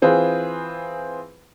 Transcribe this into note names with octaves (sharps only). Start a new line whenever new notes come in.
E3 C4 F4 G#4 B4